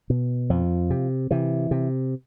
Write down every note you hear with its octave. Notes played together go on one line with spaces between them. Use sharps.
B2
F2 F3
C3
C3 E3
C3